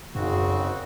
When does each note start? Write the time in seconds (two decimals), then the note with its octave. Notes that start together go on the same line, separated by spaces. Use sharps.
0.15 G#1 F#2 C#3 C4 F#4